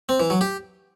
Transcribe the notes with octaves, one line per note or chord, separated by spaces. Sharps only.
C4
E3
F#3
G4